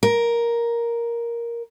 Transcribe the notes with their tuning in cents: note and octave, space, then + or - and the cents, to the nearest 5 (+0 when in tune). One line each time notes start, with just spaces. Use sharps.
A#4 +5